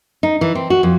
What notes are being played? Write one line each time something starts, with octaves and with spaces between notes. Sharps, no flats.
D#4
E3
C4
F#4
F2